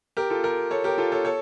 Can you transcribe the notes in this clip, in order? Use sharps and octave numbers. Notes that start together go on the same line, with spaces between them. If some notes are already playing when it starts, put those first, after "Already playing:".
G4 A#4
F4 A4
G4 A#4
A4 C#5
G4 A#4
F4 A4
A4 C#5
A4 C#5